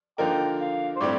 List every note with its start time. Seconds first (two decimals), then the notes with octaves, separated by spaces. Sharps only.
0.18 D3 F3 A#3 D#4 A#4 G5
0.60 F5
0.96 C5
1.01 A2 G3 C4 G4 D5